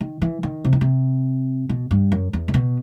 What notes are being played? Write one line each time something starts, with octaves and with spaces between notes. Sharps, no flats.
D#3
E3
D#3
C3
D#3
C3
B2
G2
F#2
E2
C3
B2